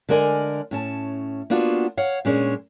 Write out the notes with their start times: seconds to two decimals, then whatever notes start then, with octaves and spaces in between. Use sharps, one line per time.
0.09 D3 G#3 A#4 D5 G#5
0.71 A2 C#4 A5
1.50 A#3 B3 D4 F4 F#4
1.97 C#5 F5 F#5
2.25 A#2 G#3 C#4 D4